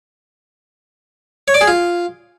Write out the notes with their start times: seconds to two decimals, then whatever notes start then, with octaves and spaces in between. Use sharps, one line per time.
1.48 C#5
1.54 D5
1.61 G#4
1.68 F4